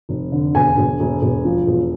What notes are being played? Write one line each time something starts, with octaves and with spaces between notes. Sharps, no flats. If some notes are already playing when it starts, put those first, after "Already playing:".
F1
D3
E1 G#5
E1
E1
E1
F3
E1